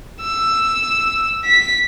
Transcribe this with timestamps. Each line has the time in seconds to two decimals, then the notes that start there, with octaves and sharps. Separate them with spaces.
0.21 E6
1.45 B6